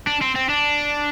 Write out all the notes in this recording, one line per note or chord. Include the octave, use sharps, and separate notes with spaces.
D4
C4
C4
D4